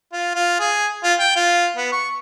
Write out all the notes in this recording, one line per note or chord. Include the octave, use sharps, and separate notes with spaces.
F4
F4
G#4
F4
G5
F4
B3
C#6